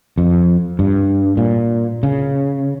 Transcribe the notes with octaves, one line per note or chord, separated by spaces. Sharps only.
F2
G2
A#2
C#3